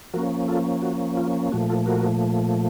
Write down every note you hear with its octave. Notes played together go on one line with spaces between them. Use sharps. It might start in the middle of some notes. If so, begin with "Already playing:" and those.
F3 A#3 C#4 F#4 A#4
F4 A4
F#4
F4
A#2 F3 A3 F#4
F4 A4
F#4 A#4